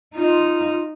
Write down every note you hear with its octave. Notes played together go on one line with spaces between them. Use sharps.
D#4 F4